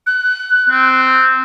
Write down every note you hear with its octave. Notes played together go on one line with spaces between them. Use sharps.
F#6
C4